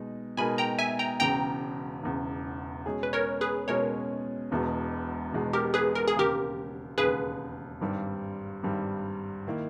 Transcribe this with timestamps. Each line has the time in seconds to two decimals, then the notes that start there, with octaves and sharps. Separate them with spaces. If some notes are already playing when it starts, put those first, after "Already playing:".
Already playing: B2 G#3 D#4
0.37 B2 G#3 D#4 A#4 G#5 B5
0.58 G5 A#5
0.79 E5 G#5
0.99 G5 A#5
1.20 E1 E2 C#3 G5 A#5
2.03 E1 E2 C#3
2.86 B2 G#3 C#4 G#4
3.03 B4
3.13 A#4 C#5
3.41 G#4 B4
3.68 B2 G#3 C#4 G#4 A#4 C#5
4.51 E1 E2 B2 G#3
5.32 E1 E2 B2 G#3
5.53 G4 A#4
5.74 G#4 B4
5.95 A#4
6.08 G#4
6.15 E1 D#2 C#3 G4 A#4
6.98 E1 D#2 C#3 G#4 B4
7.81 G#1 G2 G3
8.63 G#1 G2 G3
9.47 D#3 A#3 E4